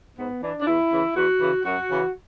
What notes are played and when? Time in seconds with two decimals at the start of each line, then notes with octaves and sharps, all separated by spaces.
0.17 G#2 B3
0.42 E3 D4
0.61 D4
0.67 E2 E4
0.91 C#3 E3
1.16 E2 F#4
1.40 C#3 E3
1.64 F#2 F#4
1.90 C#3 E3